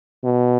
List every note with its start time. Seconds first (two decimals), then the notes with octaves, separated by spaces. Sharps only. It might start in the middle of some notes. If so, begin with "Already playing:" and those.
0.24 B2